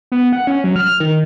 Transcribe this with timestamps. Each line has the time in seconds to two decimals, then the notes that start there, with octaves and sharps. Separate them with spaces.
0.12 B3
0.33 F#5
0.47 C#4
0.64 F#3
0.76 F6
1.00 D#3